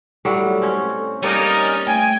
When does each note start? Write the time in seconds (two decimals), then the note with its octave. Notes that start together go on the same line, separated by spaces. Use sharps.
0.25 A2 F#3 G3 A4
0.62 C4 C#4
1.23 G3 A#3 C#4 D#4 A#4 A6
1.87 A3 G5 G#5